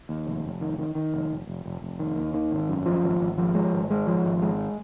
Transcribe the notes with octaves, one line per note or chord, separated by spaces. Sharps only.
D#2
F1
F1
D#3
D#3
D#3
F1
F1
F1
F1
F1
D#3
D#2
D#3
G#1
F#2
F3
G#1
G#1
F3
G#3
G#1
G#3
F3
G#1
G#3